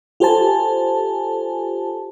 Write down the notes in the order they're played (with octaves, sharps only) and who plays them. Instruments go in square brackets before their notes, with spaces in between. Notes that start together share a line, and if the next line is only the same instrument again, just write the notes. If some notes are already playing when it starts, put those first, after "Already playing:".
[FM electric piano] F4 G4 A4 C5 G#5 A5